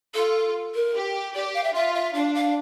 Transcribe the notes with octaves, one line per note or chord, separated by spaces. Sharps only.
F4 A4
A#4
G4
G4 D5
F5
E5
F4 E5
E5
D4 F5
F5